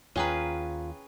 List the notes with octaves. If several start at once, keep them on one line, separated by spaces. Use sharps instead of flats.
D#2 C#4 F4 G#4 B4 C#5 G5 A#5